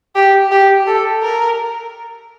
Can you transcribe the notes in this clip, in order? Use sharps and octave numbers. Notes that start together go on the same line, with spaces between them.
G4
G4
A4
A#4